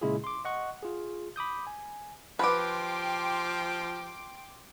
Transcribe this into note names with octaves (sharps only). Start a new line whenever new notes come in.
A#2 C#3 G#3 E4 F4 G#4
C6 D6
D#5 F#5 C#6
F4 G#4
B5 D6 D#6 G6
G#5
F3 G4 B4 G5 C6 D6